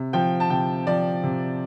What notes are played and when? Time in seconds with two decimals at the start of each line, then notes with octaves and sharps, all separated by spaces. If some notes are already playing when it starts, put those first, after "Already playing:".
Already playing: C3
0.13 F3 G5
0.40 A5
0.50 C3 G5
0.87 F3 D5
1.23 C3